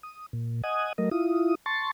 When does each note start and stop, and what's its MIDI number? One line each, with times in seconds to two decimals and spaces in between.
0.03 0.26 87
0.33 0.62 46
0.64 0.93 75
0.64 0.93 78
0.64 0.93 80
0.64 0.93 87
0.98 1.09 54
0.98 1.09 57
0.98 1.09 70
0.98 1.09 75
1.11 1.55 64
1.11 1.55 65
1.11 1.55 87
1.66 1.91 81
1.66 1.91 84
1.66 1.91 85
1.66 1.91 93